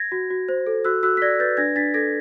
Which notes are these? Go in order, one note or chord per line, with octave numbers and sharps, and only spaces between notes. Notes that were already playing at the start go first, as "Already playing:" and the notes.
Already playing: G#6 A#6
F#4
F#4
C5
A4
F#4 E6 F#6
F#4 E6 F#6
B6
D5 G#6 A#6
B4 G6 A6
D4 G#6 A#6
D4 A6 B6
A4 G#6 A#6